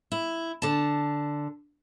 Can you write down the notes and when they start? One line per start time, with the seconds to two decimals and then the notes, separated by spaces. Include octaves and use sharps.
0.12 E4
0.62 D3 A5